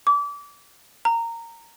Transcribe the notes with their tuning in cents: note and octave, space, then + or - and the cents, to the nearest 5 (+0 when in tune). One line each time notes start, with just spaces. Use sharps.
D6 -30
A#5 -15